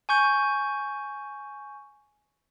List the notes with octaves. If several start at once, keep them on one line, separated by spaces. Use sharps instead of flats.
G#5 C#6 G6